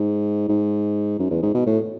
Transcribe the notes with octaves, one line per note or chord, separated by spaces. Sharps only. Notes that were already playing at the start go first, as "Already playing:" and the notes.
Already playing: G#2
G#2
F#2
E2
G#2
B2
A2